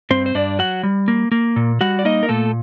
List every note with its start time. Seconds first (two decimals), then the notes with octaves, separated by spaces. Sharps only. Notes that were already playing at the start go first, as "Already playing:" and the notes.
0.10 G2 C4 C5
0.26 C5
0.35 G2 D4 D5
0.59 F#3 F#4 F#5
0.83 G3
1.08 A#3
1.32 A#3
1.56 A#2
1.81 G3 F#4 F#5
1.99 D5
2.05 A#3 D#4 D#5
2.23 A#4
2.29 A#2 A3 A4